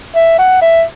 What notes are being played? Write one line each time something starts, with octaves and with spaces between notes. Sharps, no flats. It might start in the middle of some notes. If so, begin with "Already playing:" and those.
E5
F#5
E5